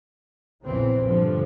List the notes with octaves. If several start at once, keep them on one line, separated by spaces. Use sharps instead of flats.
A#1 E2 A#2 C#3 E3 C4
D2 G2 B2 D3 F3 G3